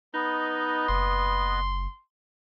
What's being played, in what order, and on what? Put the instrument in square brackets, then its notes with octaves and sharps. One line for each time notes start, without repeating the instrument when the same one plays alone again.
[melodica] B3 B4 D#5 [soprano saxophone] D#4
[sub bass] F#1 [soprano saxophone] C6